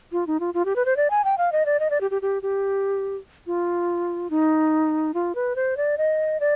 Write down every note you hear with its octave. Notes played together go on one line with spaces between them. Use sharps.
F4
D#4
F4
F4
G4
B4
C5
D5
G#5
G5
F5
D#5
D5
D#5
D5
G4
G4
G4
G4
F4
D#4
F4
B4
C5
D5
D#5
D5